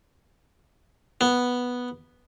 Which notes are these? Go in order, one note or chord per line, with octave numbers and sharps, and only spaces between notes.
B3